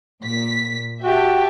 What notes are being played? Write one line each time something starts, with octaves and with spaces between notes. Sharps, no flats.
A#2 B6
F#4 G4 E5 G5 A5